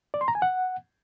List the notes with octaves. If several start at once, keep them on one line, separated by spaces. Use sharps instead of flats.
D5
C6
A#5
G#5
F#5